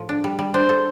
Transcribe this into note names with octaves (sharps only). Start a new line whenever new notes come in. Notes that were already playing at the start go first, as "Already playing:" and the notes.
Already playing: A2 F3
D4
G3
G3
D4 C5
A4